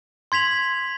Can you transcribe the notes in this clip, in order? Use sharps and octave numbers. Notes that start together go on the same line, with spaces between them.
C6 G#6 B6 F7 F#7